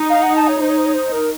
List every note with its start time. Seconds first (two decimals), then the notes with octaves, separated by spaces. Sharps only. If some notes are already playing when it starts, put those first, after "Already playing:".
Already playing: D#4
0.09 F5
0.22 F#5
0.35 A5
0.47 C#5
0.60 D#4 C5
0.69 C#5
0.77 C5
0.85 C#5
0.93 C5
1.11 A#4